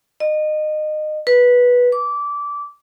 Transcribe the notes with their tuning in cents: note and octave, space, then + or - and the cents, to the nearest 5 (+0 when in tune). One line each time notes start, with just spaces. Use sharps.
D#5 -25
B4 -10
D6 -20